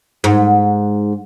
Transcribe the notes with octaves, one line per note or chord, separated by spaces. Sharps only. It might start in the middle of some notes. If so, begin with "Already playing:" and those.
G#2